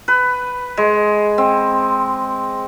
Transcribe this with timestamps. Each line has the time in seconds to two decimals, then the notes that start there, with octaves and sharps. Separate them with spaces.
0.08 B4
0.77 G#3
1.38 C4